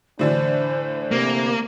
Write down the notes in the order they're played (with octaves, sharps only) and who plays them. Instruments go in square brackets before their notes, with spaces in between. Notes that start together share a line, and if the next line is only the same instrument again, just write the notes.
[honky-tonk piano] A2 D3 E3 [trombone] D4 [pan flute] C5
[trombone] C3 [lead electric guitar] A#3